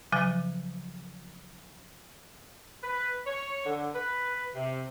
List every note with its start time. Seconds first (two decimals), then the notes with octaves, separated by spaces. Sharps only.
0.12 C#3 F3 F#3 G#5 A6
2.83 B4
3.27 C#5
3.66 D3
3.95 B4
4.55 C3